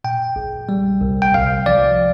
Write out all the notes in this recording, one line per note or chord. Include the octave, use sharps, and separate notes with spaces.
A#2 G5
A#1
G3
C2
G5
C2 F5
F3 D5